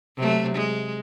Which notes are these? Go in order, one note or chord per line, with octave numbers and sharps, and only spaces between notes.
C3 F#3 A3
G#3